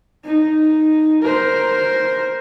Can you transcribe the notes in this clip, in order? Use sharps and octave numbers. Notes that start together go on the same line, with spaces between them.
D#4
A#4 C5